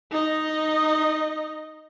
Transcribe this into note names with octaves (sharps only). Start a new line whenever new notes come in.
D#4 D#5